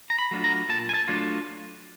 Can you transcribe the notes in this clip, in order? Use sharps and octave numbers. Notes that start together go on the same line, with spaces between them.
A#5
B5
F#3 A3 D4 F4
A#5
A#2 A5
G#5
A5
F#3 A3 D4 F4